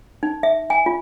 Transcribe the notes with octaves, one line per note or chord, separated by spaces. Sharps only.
D#4
E5
G#5
F4